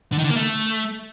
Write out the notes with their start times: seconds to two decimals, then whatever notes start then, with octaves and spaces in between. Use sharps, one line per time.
0.12 D3
0.18 D#3
0.24 D3
0.30 A#3
0.36 A3